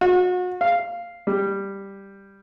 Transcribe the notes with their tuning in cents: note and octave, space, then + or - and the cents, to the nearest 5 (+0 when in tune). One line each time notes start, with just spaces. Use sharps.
F#4 -35
F5 -5
G3 +5